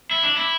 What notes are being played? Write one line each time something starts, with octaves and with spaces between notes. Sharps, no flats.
E4
D4
E4